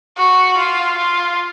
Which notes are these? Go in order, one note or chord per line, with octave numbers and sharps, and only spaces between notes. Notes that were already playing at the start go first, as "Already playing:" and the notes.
F#4
F4
F4